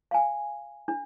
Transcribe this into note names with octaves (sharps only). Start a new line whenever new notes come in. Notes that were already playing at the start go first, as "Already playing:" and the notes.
F5 G#5
D4